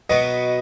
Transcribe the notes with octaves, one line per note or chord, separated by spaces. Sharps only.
B2 F#3 B3 D#5